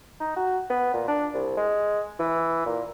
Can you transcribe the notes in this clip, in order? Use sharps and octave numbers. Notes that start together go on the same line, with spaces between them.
D#4
F#4
B3
A#2
D4
C2
G#3
E3
A#2